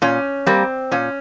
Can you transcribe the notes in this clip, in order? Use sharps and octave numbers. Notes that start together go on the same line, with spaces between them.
A#2 C#4
G3 A#3 C4
A#2 C#4